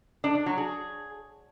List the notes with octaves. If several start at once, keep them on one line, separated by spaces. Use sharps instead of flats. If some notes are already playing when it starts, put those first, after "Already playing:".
D4
D4
F#3
G#4